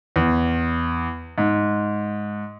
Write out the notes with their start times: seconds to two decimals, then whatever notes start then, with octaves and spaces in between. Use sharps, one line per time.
0.16 E2
1.38 G#2